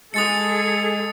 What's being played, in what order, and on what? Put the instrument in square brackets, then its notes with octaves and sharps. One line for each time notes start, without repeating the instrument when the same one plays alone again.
[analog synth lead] G#3 [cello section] G#4 A4 [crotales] D#6 A6 C#7